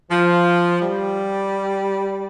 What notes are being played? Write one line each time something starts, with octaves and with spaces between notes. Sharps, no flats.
F3
G3